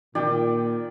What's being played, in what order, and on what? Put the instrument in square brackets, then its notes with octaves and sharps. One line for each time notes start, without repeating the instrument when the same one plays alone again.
[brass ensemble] A#2 [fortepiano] D#3 [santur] D5 G5